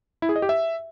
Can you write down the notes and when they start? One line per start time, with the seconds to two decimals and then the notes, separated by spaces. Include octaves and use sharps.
0.22 E4
0.29 G#4
0.36 D#5
0.42 G4
0.49 E5